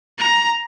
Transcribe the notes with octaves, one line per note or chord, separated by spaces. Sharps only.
A#5